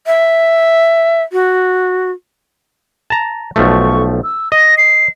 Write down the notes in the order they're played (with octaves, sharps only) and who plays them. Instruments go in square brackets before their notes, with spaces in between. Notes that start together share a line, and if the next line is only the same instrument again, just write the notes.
[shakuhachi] E5
F#4
[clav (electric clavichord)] A5 A#5
[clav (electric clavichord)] B1 F3 A3 [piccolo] C#6
[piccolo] E6
[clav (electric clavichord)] D#5 [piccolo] A#6
[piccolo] C7